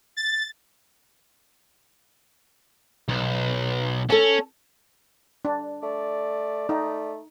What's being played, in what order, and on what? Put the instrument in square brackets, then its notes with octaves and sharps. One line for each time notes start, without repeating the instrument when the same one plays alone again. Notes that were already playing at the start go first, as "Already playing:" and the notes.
[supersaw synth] A6
[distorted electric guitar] B1
[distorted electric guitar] C#4 [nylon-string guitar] A4 A5
[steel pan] D4
[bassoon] A3 [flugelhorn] D5
[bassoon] A3 [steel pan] D#4